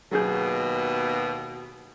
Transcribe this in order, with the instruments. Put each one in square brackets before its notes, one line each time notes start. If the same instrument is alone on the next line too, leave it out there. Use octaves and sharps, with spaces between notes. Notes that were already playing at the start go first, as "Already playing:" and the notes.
[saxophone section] D#2 B2 [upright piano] F#3 G#4 G6